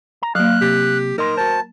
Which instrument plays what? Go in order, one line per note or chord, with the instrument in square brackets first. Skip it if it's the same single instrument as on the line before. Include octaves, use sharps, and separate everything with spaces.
[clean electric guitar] A#5
[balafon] F#3 A#3 [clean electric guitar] F5 [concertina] F#6
[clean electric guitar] C3 [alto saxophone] G4
[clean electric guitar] D#4 D#5 C6 [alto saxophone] A#4
[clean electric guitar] F#4 C5 [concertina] A5